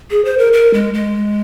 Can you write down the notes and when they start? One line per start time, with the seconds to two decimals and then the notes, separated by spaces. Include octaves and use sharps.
0.11 G#4
0.25 C5
0.38 A#4
0.53 A#4
0.74 G#3
0.94 G#3